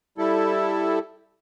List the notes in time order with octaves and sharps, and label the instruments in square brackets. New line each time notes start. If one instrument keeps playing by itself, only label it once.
[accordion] G3 E4 A4